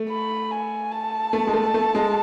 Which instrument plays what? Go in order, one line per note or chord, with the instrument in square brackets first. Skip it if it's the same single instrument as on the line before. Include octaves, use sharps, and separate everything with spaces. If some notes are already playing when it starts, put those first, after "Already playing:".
Already playing: [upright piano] A3
[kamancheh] B5
G#5
A5
[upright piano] A3
G#3
A3
A3
G#3